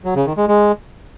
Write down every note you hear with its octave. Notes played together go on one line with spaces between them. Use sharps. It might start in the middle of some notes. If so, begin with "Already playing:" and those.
F#3
C#3
D#3
G#3
G#3